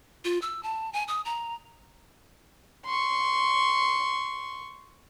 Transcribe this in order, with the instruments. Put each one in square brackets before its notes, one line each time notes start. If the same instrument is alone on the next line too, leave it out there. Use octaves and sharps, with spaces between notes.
[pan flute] F4
E6
A5
G#5
D#6
A#5
[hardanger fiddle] C6 C#6